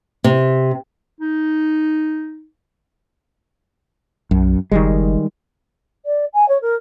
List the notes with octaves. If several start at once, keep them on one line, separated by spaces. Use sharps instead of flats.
C3
D#4
B1 F#2
F#1 D#3 G3 G#3
D5
G#5
C#5
A#4